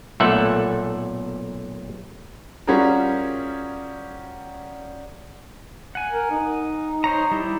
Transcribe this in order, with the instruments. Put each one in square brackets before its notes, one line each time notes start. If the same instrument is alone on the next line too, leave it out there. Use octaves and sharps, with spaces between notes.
[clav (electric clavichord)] B1 A#2 A3 A4 E5 F#5
[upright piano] G3 C#4 F4 F#4 G#4 A#4
[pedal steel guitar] F#5 G#5
[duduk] A#4
D#4
[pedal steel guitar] C5 C#5 A#5
G3 E4 G4